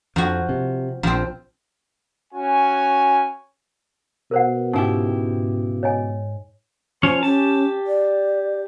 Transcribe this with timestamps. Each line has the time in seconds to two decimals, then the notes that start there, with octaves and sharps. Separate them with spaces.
0.16 F2 F3 F#4
0.49 C3
1.03 A#1 F3 C4
2.34 C#4 F#4 G#5
4.31 B2 A#4 C5 F#5
4.73 G#2 C#3 D#4 E4 G4
5.83 C#5 D#5 G#5
7.03 F3 C#4 C5 C#5
7.23 C#4 G4 A5
7.87 D5